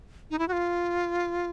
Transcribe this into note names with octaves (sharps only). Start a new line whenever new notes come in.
D#4
E4
F#4
F4